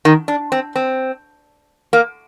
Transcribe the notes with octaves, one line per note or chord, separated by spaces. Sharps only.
D#3
D4
C4
C4
A#3